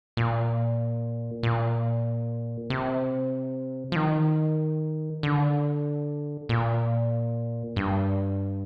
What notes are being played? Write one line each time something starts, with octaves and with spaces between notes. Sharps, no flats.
A#2
A#2
C3
F3
D#3
D3
A#2
G2